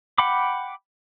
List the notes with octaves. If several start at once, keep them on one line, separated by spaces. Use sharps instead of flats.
F#5 G5 B5 D6